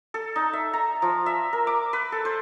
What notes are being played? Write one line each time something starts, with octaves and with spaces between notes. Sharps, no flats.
A4
D#4
E5
A#5
F3
E5
A#4
D6
B4
A4
C5